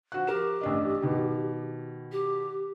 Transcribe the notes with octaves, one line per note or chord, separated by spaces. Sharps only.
F3 F#4 F#6
G4 A#4 E7
A1 D4 D#5
B2 D#3
G4